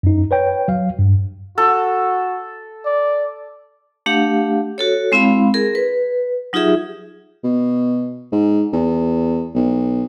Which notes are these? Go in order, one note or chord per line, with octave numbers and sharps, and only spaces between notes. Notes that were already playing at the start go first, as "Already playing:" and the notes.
F#2 D#4
B4 C#5 G5
F#3 F5
G2
F#4 A4
D5
A3 D4 G4 F5 F#5
F#4 A4 C#5
G#3 C4 E4 F5 B5
G#4 A#4
B4
F#3 D#4 F4 G4 G#4 E5
B2
G#2
E2
B1